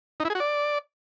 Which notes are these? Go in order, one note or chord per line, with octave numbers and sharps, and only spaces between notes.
D#4
E4
G#4
F#4
D5